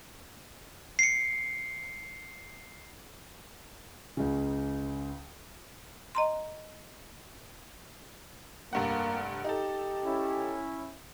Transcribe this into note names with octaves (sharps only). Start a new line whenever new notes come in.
C7 C#7
C#2 C#3
D#5 A#5 C6
F1 G2 A#3 F#5
D#4 G4 A4
C#4 E4